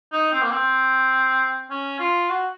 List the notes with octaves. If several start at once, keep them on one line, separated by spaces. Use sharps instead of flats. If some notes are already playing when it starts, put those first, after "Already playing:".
D#4
C4
A#3
C4
C#4
F4
F#4